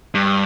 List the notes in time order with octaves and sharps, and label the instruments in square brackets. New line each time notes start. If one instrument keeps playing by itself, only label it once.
[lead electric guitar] G2